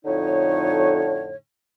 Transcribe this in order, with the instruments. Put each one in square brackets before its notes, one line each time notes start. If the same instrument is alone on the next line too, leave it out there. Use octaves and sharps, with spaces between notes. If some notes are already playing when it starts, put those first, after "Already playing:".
[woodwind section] F2 A2 D3 D#4 C#5